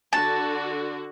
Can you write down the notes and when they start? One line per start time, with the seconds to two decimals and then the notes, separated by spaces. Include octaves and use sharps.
0.13 D3 F#4 A5